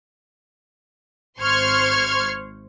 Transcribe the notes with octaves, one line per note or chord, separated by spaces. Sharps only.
G#1 C5 C6 C#6 F6 G#6